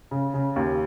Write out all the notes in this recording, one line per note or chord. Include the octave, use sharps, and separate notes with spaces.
C#3
C#3
D#2